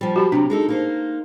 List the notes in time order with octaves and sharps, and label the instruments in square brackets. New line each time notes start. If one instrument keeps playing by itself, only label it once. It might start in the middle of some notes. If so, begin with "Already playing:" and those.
[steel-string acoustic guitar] F3 G3
[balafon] F#4 G4 B5
[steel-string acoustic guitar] C3 F#3 [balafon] D4
[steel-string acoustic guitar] G#3 D#4 A4
A#3 D#4 C5